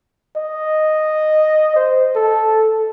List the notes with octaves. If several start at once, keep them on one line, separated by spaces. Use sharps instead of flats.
D#5
C5
A4